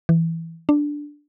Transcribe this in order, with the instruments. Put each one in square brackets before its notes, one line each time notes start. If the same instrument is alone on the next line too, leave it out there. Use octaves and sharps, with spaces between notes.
[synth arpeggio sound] E3
D4